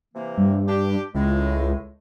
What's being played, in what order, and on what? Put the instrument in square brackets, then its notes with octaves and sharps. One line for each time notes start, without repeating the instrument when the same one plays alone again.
[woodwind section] C3 E3 A#3
[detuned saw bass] G2
[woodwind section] D4 G4
[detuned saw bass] C#2 [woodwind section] A2 G#3